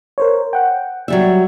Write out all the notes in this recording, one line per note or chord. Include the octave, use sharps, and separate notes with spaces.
A#4 C5 C#5
F#5 G5
F#3 G3 E5